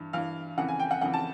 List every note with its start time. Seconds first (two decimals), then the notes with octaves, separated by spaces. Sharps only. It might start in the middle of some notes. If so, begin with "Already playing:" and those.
Already playing: G2 E3
0.13 G2 E3 F5
0.57 F2 C#3 E3 F#5
0.68 G#5
0.80 G5
0.91 F#5
1.01 F2 C#3 E3 F#5
1.14 A5